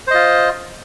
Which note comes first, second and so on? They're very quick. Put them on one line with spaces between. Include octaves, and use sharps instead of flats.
C5 D#5 F4